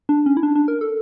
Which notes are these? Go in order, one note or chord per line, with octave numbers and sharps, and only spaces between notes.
D4
C#4
E4
D4
D4
A#4
A4